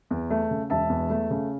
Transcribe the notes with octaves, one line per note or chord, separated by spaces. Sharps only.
E2
A3
C#3
E1 E5 A5
E2
A3
C#3